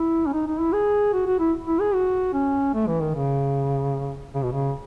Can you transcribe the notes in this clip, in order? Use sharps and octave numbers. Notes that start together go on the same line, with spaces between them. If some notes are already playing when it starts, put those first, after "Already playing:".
Already playing: E4
C#4
D#4
D#4
E4
G#4
F#4
F#4
E4
E4
G#4
F#4
C#4
A3
E3
D#3
C#3
C#3
B2
C#3